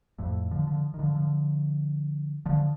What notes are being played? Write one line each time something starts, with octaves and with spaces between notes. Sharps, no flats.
F2 A2
D3 F3
D3 F3
D#3
D3 F3
D3 F3
D3 F3